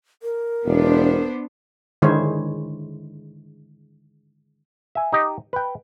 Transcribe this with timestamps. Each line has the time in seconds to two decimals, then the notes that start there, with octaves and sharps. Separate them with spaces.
0.23 A#4
0.66 E1 B3 D4 C5
2.02 D3 D#3 G#3 E4 C5 C#5
4.95 E5 G#5
5.13 D#4 G4 D#5
5.53 B4 G5